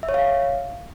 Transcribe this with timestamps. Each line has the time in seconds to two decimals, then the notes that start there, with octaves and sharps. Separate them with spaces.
0.03 E5
0.09 C#5
0.14 F5